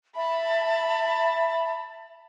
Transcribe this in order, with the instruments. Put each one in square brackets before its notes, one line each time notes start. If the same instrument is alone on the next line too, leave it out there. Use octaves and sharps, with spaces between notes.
[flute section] E5 A5 [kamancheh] B5